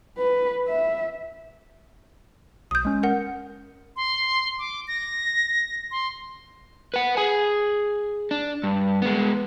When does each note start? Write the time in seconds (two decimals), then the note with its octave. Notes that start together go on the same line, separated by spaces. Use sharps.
0.18 B4
0.68 E5
2.71 B1 D#6 G6
2.85 G#3 C#4
3.03 A#4 F#5
3.96 C6
4.59 D6
4.88 A#6
5.91 C6
6.94 B4 F#5
7.17 G#4 G#5
8.31 D4
8.63 G2
9.02 G#3 B3